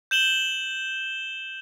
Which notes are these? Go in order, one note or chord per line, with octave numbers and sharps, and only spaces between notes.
G6 E7 F#7 G7